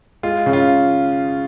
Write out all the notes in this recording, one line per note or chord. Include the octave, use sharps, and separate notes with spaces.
G#3 F4
C#3
F4